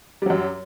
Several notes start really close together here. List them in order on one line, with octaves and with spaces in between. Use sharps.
G3 F#3 F#2